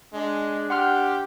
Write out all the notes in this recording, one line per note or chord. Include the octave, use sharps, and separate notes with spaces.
G#3 D4
G4 F#5 C6 F6